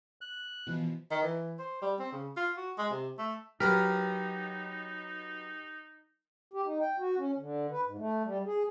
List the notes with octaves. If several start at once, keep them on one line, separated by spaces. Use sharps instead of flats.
F#6
B2 E3 F3
D#3
E3
C5
G3
C4
C#3
F4
F#4
G#3
C3
A3
F#3 D#4 G4 A#4 B4 B6
G4
D#4
G5
F#4
C#4
D3
B4
G#2
A3
G3
G#4